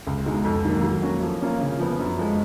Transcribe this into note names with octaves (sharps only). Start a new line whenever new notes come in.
C#2
B2 G#3 D#4
F2
D#3 F#3 A#3
F#3
A#3 C#4 F#4
F3
A#3 C#4 F4
C#3
F3 B3
F#2
F3 G#3